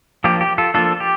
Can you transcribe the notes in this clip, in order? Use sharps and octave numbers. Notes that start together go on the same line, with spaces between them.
F3 A#3 D4 G4
G4
F4 A4
F3 A#3 D4 F4 A4
G4